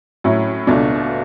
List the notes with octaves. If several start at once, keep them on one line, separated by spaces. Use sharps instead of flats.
A2 F#3 C#4 E4
C#2 B2 A3 D4